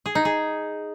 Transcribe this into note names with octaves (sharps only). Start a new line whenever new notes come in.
G#4
D#4
G#4